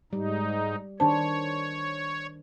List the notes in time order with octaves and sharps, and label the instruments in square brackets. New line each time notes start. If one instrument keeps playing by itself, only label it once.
[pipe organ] G#2 D#4 [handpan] G3
[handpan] D#3 D4 C5 [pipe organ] C#5 [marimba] A5